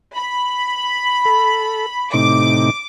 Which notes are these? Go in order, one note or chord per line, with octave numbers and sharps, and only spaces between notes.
B5
A4
A2 C3 D#4 D6